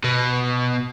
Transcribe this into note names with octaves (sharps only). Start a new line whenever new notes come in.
B2